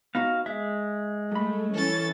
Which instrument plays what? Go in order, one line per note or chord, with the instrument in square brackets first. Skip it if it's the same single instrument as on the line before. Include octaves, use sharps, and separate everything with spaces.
[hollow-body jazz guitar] B3 D#4 F#4 [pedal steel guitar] F5
[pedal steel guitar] G#3 [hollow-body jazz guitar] E5
[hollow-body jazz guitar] G2 B5 [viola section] A3
[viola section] E3 C#4 [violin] A4 A6